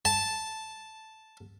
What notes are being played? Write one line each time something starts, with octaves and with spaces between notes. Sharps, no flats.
A5